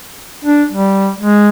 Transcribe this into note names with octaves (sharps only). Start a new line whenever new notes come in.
D4
G3
G#3